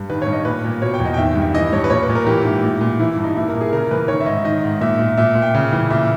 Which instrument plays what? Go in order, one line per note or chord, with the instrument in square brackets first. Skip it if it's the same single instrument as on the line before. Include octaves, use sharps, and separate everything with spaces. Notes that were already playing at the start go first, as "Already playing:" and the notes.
Already playing: [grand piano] G2
D#3 B4
C#5
G2
D#5
A#2 B4
A#2
B2 C#5
G5
E2
D#5
G5
D#3 E5
G2
E5
E3 D#5
G2 C#5
B4
A#2 C#5
B4
A#2
A#4
E3 G4
G#2 E4
A#2
A#2
E3 E4
G2
D#4
A#2 E4
A#4
A#2
G#4
C#3 A#4
E3 B4
D#3 C#5
E5
G#2 D#5
D#3 D#5
G#2
A#2 E5
A#2
A#2 E5
A#2
G5
C#3
E3
A#2 E5